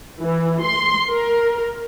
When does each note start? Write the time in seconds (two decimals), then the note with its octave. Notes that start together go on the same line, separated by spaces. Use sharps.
0.22 E3
0.63 C6
1.08 A#4